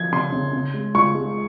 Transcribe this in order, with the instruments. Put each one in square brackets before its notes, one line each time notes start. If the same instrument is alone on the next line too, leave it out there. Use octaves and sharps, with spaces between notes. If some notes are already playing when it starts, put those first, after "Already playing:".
Already playing: [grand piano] F3 [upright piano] G#6
[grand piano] C#3 [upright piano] C6
[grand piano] C#3
C#3
G#3
[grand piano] C#2 [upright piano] C#6
[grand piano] G#3